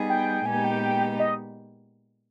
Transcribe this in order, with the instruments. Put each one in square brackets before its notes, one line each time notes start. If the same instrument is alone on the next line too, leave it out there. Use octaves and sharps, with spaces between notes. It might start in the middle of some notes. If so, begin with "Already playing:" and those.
Already playing: [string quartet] G3 B3 D#4 G#4
[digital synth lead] G5
[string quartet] A#2 G#3 B3 D#4 G4 [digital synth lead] G#5
[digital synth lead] G5
G5
D#5